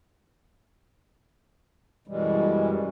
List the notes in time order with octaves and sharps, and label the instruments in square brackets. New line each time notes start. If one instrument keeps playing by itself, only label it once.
[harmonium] F#2 B2 E3 G3 G#3